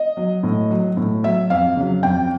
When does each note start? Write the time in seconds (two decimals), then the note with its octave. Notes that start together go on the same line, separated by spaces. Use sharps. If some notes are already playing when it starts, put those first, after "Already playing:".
Already playing: D#5
0.17 F#3
0.43 A2
0.70 F#3
0.97 A2
1.23 F#3 E5
1.50 F2 F5
1.76 C#3 F#3
2.03 F2 G5